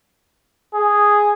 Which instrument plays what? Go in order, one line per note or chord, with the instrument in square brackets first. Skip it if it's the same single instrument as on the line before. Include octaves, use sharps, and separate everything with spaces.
[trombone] G#4